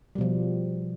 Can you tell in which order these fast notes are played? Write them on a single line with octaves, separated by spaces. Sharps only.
G3 B2 F3